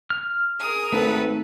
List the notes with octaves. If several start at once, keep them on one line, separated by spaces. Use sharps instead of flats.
F6
G#4 A#4 D#6
G#1 A3 A4 B4